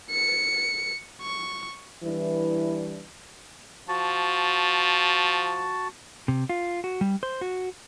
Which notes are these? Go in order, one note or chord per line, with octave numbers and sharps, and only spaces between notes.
C#7
C#6
E3 G3 D4 E4 B4
F3 F#4 A5
C3
F4
F#4
G3
C5
F#4